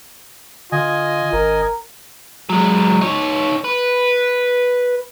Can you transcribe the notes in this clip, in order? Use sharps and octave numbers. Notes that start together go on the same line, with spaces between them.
D3 F4 D#5 G#5
G#1 A#4
F#3 G#3
D#4 C#5
B4